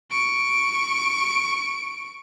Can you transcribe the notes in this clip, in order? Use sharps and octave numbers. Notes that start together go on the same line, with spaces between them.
C#6 D7